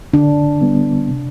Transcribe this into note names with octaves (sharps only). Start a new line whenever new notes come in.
D3 D4
G3 B3
C3